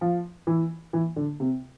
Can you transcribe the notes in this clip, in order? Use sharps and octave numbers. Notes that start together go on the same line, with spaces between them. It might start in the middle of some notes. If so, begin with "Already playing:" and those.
F3
E3
E3
D3
C3